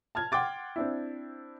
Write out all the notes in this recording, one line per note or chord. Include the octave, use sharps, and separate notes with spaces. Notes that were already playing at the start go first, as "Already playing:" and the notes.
A5 F6 G#6
F#5 G5 C6 D6 A6
C4 D4 E4